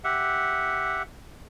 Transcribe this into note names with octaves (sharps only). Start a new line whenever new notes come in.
G4 E5 F#5